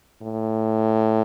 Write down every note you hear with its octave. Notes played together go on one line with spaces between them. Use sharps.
A2